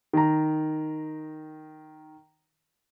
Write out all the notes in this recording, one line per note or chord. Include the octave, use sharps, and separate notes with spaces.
D#3 A#5